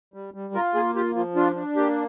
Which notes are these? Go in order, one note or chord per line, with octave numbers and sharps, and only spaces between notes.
G3
G3
F4 A#4
A#3 G#4
F4 G4
F3 F4
D4 F4
D4
A#3 G4